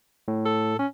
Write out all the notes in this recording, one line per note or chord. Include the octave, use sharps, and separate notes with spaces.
A2
A4
C#4